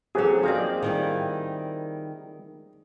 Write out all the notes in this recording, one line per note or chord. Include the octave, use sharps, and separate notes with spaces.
E3 F#3 A3 C4 C#4 G#4
F3 A#3 C4 D#4 G4 D5
D#3 G3 E4